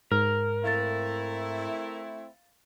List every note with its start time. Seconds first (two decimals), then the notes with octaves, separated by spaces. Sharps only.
0.12 G#2 A#4 F6
0.64 A3 C4 E4 F5 A6